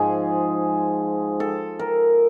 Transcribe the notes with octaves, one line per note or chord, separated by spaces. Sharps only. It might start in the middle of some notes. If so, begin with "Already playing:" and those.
Already playing: G#2 F3 G#4
A4
A#4